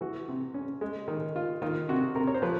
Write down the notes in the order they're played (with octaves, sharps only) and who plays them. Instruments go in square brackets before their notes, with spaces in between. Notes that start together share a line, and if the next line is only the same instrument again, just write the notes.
[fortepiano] E3 F#4
C3
C#4
G#3
D#3
F4
D#3 F4
C3 F#4
C3 A#4
C#5
C5
F3 B4